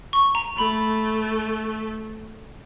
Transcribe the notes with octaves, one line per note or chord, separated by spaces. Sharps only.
C#6
A#5
A3 B5